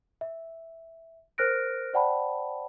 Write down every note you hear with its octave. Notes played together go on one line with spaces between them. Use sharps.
E5
A#4 C5 F6 F#6 A#6 D7
C5 D5 F#5 G5 A5 B5